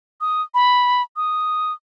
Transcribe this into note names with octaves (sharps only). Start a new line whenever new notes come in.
D#6
B5
D#6